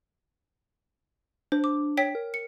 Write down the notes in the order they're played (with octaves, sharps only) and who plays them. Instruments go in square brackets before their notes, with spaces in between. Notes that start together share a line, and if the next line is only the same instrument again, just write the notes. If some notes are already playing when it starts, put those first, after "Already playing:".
[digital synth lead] D4 [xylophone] C5
[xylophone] D6
C#5 G5 B6
[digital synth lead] A#4
[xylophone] C#7